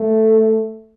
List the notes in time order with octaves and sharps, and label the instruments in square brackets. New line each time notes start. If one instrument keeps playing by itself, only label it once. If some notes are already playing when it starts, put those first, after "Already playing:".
Already playing: [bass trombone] A3